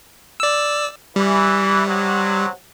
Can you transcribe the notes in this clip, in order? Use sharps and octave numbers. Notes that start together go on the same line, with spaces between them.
D5 E6
E3 G3
C3 F#3